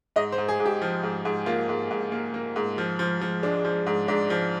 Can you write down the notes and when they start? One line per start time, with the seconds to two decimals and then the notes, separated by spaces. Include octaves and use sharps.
0.16 G#2 D#5
0.32 C5
0.38 G#2
0.48 G#4
0.60 G#2
0.66 G4
0.82 F3
1.03 G#2
1.25 G#2
1.46 A#3 F4
1.69 G#2
1.91 G#2
2.12 A#3
2.34 A#3
2.56 G#2
2.78 F3
2.99 F3
3.21 F3
3.43 G#3 D4
3.65 F3
3.87 G#2
4.08 G#2 D4
4.30 F3